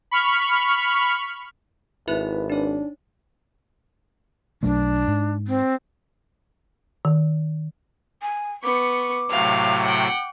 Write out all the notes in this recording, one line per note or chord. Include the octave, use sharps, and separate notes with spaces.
B5 C#6 F6
G#1 E4 B4 E5 B5
D4 D#4 C#5
B1 F#3 A3 D4
G#2
C4
D#3
G#5
B3 C#6 D6
A2 C3 F#3 F5
F#5 G5